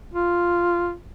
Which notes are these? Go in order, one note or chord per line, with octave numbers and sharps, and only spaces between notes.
F4